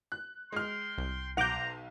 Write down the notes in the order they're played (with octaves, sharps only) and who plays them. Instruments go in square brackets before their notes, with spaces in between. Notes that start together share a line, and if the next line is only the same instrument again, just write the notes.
[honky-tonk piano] F#6
[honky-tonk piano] G#3 F6 [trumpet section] G5 C6
[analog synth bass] C2
[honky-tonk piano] B1 F7 [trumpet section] C5 A#5 [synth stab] F#5 D6 G6